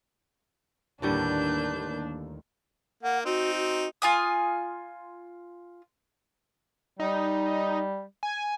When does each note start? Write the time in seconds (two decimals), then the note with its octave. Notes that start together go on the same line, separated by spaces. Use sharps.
1.02 D#2 A2 D3 G3 D4 A#4 B4 G6
3.03 A#3 F#5
3.26 C4 D#4 F#4
3.56 F#4
4.02 F4 G#5 D#6
7.00 G3 D#4
8.23 G#5